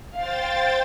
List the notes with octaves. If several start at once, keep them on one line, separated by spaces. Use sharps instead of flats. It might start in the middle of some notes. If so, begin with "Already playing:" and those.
C5 F5 G5 A6